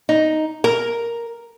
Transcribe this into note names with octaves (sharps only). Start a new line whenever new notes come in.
D#4
A#4